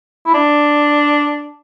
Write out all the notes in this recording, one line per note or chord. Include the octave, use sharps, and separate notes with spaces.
E4
D4